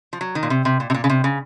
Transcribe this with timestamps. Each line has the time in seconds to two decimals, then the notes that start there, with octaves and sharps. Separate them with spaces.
0.13 F3
0.21 F#3
0.35 D#3
0.43 A#2
0.50 C3
0.65 C3
0.80 A#2
0.90 C3
0.94 A#2
1.04 C#3
1.10 C3
1.24 C#3